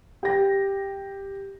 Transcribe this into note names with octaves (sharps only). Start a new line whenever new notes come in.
G4 A#6